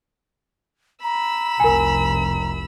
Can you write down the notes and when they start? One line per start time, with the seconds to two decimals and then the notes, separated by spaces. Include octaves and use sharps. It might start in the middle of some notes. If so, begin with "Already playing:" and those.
1.04 A#5 B5 E6
1.60 F1 C2 A#4 G#5